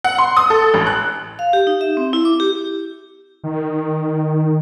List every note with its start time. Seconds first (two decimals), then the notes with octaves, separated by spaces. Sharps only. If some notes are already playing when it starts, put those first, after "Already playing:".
0.04 F#5
0.18 C6
0.37 D#6
0.50 A4
0.74 A1
0.87 F#6
1.39 F5
1.53 G4
1.67 D#4
1.81 E5
1.97 C4
2.13 E4
2.25 D6
2.40 G4
3.44 D#3